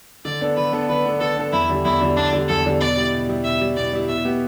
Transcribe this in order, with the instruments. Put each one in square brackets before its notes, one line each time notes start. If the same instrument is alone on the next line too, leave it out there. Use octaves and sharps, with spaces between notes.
[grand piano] D3 [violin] D5
[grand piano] B3 D4 A4
[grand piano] D3 [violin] B4
[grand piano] B3 D4 A4
[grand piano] D3 [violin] B4
[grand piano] B3 D4 A4
[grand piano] D3 [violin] A4
[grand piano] B3 D4 A4
[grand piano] E2 [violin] E4
[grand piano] D3 G3 D4
[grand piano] E2 [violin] E4
[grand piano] D3 G3 D4
[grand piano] E2 [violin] D4
[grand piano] D3 G3 D4
[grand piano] E2 [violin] A4
[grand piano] D3 G3 D4
[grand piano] B2 [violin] D5
[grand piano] G3 E4
B2
G3 E4
[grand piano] B2 [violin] E5
[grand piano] G3 E4
[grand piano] B2 [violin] D5
[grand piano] G3 E4
[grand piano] B2 [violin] E5
[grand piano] B3 G4